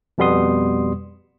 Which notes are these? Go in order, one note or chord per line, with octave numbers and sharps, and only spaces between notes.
F2 B2 G3 B3 C6 D#6